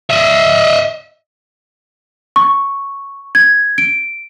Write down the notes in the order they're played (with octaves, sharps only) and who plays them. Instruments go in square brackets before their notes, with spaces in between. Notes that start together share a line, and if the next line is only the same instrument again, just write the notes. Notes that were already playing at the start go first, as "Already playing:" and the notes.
[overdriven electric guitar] D#5 E5
[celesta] C#6
G#6
D7